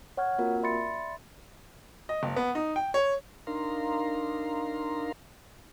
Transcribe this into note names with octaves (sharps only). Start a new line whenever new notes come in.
C#5 F#5 C#6 F6 G#6
A#3 C4 F4 F#4 A#4
D5 E5 B5 C6 A6 C#7
D#5
F#1
B3
D#4
G5
C#5
D4 D#4 A#4 F5 A#5 C6